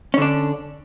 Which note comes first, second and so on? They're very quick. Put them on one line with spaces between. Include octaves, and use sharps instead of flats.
C#4 D3 D4